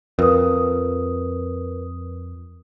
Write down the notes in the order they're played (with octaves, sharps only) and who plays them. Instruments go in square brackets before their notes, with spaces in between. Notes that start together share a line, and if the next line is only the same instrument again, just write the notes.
[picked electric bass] F2 [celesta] A#4 B4 D#6